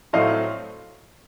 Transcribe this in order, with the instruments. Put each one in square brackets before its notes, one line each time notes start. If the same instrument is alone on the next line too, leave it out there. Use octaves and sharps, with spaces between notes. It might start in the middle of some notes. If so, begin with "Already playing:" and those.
[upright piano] A2 F#3 A3 C4 D#5 F5